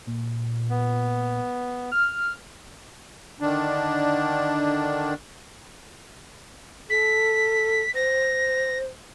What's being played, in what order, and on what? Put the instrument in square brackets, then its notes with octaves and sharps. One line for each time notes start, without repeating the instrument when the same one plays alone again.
[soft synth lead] A#2
[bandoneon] B3
[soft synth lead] F6
[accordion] D3 D#3 D4
[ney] A4 [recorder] B6
[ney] C5 [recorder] A#6